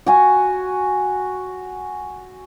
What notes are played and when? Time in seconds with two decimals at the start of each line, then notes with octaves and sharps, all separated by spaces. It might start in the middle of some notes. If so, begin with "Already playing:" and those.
0.06 F#4 G#5